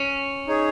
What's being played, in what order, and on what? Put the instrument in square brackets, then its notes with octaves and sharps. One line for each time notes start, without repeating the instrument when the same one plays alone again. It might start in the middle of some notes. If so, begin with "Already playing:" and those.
Already playing: [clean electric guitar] C#4
[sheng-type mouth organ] D#4 G#4 C#5